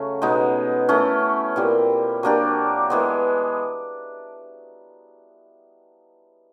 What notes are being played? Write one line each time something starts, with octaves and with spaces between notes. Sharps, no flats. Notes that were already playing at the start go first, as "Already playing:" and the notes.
Already playing: C#3 F#3 A3 C#4
B2 G#3 B3 D#4
A3 C#4 E4
A#2 G3 C4 E4
F#3 A#3 D4 G4
E3 G#3 B3